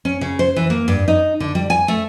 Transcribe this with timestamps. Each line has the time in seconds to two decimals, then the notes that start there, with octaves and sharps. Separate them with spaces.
0.05 C#4
0.21 C#3
0.39 C5
0.56 E3
0.70 A#3
0.88 G2
1.08 D#4
1.40 D3
1.55 G3
1.70 G#5
1.88 A3